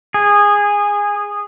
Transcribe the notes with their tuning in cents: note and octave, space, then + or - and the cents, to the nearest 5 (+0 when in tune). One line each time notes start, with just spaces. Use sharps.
G#4 -15